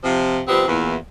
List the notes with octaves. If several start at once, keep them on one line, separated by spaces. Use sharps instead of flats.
C3 F3
C3 F3 G3 B3 C4
E2 A#2 E3